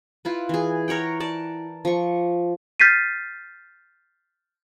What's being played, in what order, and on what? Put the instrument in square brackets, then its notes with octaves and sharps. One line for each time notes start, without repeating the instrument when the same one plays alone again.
[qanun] E4 F4 B4
E3 G#4
A#4 C#5 F#5 G5
A#4 D5 A5
F3 C#6
[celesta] F6 G6 A6 B6 C7 D#7